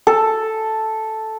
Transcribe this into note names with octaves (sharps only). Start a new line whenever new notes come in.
A4